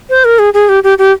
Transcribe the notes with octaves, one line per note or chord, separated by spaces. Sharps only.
C5
A#4
G#4
G#4
G4
G4
G4